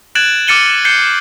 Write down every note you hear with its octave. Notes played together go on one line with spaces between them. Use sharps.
F#6 G#6 A6 D7 E7 F#7
D6 F6 A6 C#7 D#7 G7
G6 C7 C#7 G7